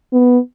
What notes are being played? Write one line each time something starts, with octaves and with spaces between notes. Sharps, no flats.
B3